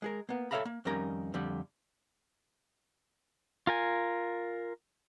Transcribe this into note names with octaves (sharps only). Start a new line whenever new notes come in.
G#3 G#4 A#4
A#3 B3
A4 C#5 E5 F5 A#5 B5
A#3
F2 D#3 G3 C#4 A#4 A#5
F2 D3 G3
F4 A#4 G#5